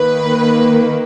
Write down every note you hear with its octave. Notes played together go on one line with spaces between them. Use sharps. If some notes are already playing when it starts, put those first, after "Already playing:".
Already playing: D#3 A#3 B4